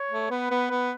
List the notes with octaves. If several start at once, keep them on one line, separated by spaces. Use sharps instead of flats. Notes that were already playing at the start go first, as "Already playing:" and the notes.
Already playing: C#5
A3
B3 B4
B3
B3